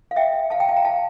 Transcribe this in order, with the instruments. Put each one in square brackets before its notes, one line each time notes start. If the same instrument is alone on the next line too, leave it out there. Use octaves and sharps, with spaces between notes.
[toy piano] F5
E5 G5
F5 A5
G5 A#5
F5 A5
G5 A#5
F5 A5